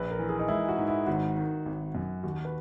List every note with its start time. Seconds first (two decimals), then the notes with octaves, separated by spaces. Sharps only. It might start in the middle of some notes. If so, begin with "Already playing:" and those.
Already playing: A#1 B4
0.11 A#4
0.19 E3
0.29 G#4
0.39 D#4
0.48 G#3 E4
0.68 F#4
0.78 G#2
0.88 E4
1.07 G#1 F#4
1.36 D#3
1.66 G#1
1.95 F#2
2.23 D#2 F#4
2.45 B4